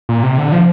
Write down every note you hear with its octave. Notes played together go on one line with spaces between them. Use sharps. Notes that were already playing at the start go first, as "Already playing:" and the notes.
A#2
C3
D3
F3